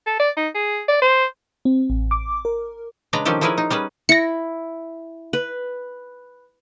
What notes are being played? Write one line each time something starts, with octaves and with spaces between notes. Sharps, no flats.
A4
D5
D#4
G#4
D5
C5
C4
A1
D6
A#4
C#3 G#3 D4 B4 A#5
D#3 F3 C#4 D4 G4 A4
F3 C#4 E4 G#4 A#4 B4
D#4
G3 C#4 G#4 B4
E4 A#6 C#7
B4